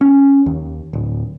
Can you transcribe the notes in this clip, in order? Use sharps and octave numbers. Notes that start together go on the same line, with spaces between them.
C#4
D#2
D1